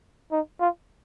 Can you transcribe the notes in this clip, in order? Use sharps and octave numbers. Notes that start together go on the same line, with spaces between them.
D#4
F4